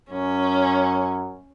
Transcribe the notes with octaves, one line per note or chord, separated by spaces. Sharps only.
F#2 C#4